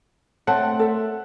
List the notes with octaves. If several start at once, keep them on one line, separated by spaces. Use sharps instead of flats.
A3 C4 C#5 F#5 G5 A5
A4 E5